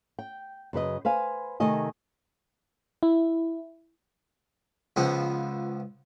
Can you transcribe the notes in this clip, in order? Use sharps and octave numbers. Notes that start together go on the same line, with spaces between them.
G5
F#2 C#3 B4 D#5
B4 C5 F5 G#5
C3 D#3 A3 D#5 G#5
E4
C#2 F3 B3